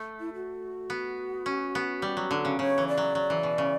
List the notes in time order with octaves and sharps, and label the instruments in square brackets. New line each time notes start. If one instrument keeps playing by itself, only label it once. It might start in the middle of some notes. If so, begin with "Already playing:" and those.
Already playing: [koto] A3
[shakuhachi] E4
F#4
[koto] B3
C#4
B3
G3
F#3
D3
C#3
[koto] C#3 [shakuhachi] C#5
[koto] E3
[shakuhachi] D5
[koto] F#3
F#3
E3
B2
C#3